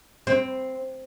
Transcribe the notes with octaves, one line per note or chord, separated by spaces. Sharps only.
C4